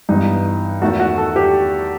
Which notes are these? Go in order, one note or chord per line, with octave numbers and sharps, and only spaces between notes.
G2 E3 B3 D#4
E2 D#3 A3 F#4
F#4
A4
G4